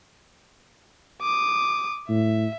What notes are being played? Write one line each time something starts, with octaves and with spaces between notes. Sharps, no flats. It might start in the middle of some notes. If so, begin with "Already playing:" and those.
D6 D#6
A2 E5